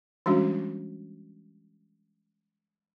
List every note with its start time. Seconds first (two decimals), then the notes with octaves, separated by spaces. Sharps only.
0.26 E3 G3 G#3 C#4 D4 F#4